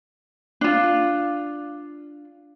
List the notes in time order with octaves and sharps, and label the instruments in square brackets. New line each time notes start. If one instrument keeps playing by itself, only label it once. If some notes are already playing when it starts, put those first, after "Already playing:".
[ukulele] D4 F4